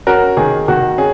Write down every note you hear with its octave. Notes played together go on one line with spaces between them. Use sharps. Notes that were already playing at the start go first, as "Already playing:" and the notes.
C#4 F#4 A#4
D#3 G#4
D#3 F#4
C#4 G#4